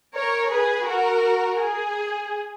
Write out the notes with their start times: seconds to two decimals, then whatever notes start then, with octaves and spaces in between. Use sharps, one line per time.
0.16 A#4 C#5
0.52 G#4 B4
0.88 F#4 A#4
1.61 G#4